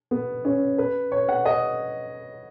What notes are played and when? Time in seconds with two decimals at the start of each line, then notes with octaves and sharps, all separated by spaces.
0.11 B3
0.45 C#4
0.78 B4
1.12 C#5
1.29 F#5
1.45 D#5